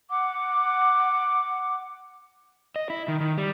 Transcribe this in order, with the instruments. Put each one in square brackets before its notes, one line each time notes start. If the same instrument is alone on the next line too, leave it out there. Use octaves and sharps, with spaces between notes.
[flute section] F#5 D6
[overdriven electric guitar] D#5
E4
D#3
D#3
G3